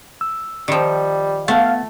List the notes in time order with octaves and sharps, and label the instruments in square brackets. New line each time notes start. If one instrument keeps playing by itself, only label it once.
[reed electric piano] E6
[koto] D#3 F3 [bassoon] G3
[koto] A3 [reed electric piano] B3 F#5 A6 [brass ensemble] F5